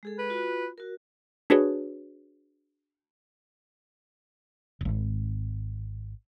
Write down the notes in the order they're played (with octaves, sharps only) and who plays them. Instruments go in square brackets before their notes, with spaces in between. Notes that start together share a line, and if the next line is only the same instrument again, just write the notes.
[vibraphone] G#3 G#4 A4
[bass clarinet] B4
[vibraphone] F4 F#4
F#4 A#4
[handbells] D4 F#4 G#4 B4 C#5
[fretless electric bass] D#1 G#1